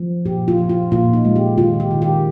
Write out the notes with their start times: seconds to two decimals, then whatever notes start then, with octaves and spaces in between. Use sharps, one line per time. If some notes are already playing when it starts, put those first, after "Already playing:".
Already playing: F3
0.25 A#2 G4
0.48 F4
0.58 F3
0.69 F4
0.91 A#2 F4
1.13 D#4
1.25 G#3
1.36 G4
1.58 D#3 F4
1.80 G4
1.91 D#3
2.02 G4